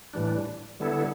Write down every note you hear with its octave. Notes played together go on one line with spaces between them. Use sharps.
A2 E3 G3 D4
D3 G3 B3 E4 A4